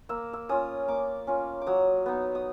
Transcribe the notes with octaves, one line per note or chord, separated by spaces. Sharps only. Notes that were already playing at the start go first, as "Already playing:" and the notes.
A#3 E6
E6
C#4 F4 D#6
A#3 D6
C#4 F4
D6
F#3 D#6
B3 D#4
D#6